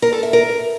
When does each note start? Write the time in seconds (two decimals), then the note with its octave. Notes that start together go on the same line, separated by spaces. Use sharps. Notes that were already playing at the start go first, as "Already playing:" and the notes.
0.02 A#4
0.13 A4
0.23 E5
0.33 A#4